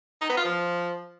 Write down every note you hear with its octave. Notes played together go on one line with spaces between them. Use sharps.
D#4
B3
F4
F3